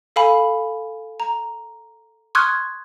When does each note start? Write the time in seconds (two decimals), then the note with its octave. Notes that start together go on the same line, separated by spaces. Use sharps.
0.16 A4 F5 G#5 B5
1.20 A#5
2.35 C6 C#6 D#6 F6 F#6 G#6